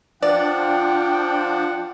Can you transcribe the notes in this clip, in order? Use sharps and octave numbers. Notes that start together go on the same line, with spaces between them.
F3 D4 F4 D5 F#5 G5